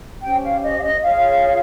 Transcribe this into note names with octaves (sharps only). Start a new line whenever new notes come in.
C#4 G4 C5 G5
F5
D#5
F5
D#5
F4 G#4 C#5 F5